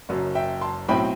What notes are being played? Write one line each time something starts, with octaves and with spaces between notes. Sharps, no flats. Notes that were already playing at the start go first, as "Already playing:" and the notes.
F#1 F#2 F#3
E5 G5
A5 C6
B1 A2 F#3 C4 E4 G5 B5